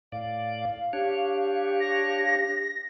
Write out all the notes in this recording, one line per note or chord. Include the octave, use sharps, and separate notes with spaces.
A2 D5 F5
D4 G4 C#5
A#6